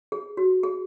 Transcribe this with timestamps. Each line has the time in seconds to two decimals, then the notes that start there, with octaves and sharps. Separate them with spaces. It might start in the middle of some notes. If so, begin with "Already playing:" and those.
0.12 G#4
0.37 F#4
0.63 G#4